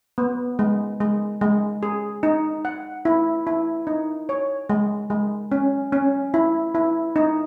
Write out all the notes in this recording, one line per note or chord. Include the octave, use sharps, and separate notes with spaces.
B3
G#3
G#3
G#3
G#4
D#4
F#5
E4
E4
D#4
C#5
G#3
G#3
C#4
C#4
E4
E4
D#4